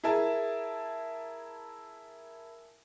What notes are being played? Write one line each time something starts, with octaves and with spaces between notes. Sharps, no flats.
E4 G#4 A#4 E5 A5